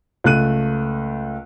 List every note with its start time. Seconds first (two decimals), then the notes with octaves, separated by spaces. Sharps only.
0.24 C#2 A3 F#6 D#7